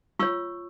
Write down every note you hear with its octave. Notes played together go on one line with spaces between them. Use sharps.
F4 C#5 C#6 E6